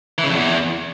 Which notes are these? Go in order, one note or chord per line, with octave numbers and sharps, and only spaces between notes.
E3
C#3
F2
E2